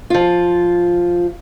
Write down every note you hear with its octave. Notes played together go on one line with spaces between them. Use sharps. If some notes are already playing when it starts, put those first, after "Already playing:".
F3 F4